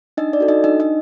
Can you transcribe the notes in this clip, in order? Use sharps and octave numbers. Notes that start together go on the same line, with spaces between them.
D4 D#4 D#5
D5
F#4 A4
D#4 D#5
D4 D#4 D#5
D#4 D#5